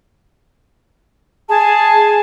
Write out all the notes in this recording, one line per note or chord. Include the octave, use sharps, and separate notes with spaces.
G#4 A5